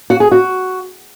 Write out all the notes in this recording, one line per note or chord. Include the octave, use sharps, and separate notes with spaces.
F#4
G#4
F#4